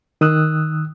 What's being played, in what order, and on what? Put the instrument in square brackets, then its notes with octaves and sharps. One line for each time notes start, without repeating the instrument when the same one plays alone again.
[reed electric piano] D#3 D#6 E6 F#6